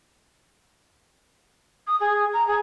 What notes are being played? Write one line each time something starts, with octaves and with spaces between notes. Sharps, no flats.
D#6
G#4
A#5
G#4